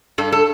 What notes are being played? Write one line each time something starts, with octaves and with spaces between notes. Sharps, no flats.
G2 A4
A4